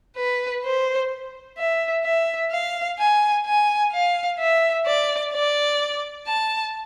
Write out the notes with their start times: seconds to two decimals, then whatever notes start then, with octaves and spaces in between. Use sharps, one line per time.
0.16 B4
0.64 C5
1.58 E5
2.04 E5
2.51 F5
2.98 G#5
3.45 G#5
3.92 F5
4.39 E5
4.86 D5
5.33 D5
6.27 A5